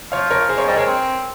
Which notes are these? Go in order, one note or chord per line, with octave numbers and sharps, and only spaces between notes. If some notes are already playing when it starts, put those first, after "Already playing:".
F3 C#5 F5
A#4 C#5
G#4 C5
F3 A#4 C#5
G3 C5 D#5
G#3 A#4 C#5
C4